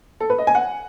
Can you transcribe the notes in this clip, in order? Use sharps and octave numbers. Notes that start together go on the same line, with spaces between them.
A4
B4
D#5
G#5
F#5